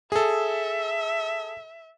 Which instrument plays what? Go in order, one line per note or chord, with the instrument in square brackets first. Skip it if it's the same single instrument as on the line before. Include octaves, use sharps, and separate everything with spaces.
[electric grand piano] G#4 A4 [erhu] E5